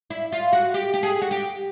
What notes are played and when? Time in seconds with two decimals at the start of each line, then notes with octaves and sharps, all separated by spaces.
0.10 E4
0.32 F4
0.53 F#4
0.74 G4
0.94 G4
1.03 G#4
1.22 F#4
1.31 G4